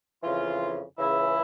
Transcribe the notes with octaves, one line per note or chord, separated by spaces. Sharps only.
F2 C#3 E3 F4
C#2 C#3 E3 E4